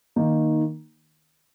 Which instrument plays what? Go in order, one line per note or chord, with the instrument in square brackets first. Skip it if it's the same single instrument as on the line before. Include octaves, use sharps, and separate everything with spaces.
[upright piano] D#3 A#3 D#4